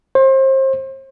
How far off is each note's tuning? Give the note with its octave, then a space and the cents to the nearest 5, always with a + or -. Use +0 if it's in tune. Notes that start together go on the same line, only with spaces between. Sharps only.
C5 +30